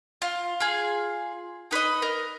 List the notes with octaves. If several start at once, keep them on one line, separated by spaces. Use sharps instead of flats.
F4
F4 G#4
D#4 B4 C5 D#5
A#4